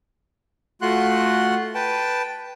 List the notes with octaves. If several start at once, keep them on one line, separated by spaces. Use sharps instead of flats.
A3 F4 F#4 F#5 C6 F#6
B4 G5 A5